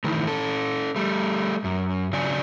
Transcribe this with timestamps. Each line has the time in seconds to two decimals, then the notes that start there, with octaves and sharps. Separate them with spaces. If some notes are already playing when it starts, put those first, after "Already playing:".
0.04 D#3 E3 A3
0.27 C#4 A4
0.96 G3 A3
1.64 F#2
2.13 C#3 F#3 D4 D5 G#5